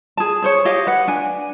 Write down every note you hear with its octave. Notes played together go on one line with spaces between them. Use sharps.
G#4 A5
G#4 C5 C#5
G4 C#5 D#5 F5
B4 F#5
D4 G#5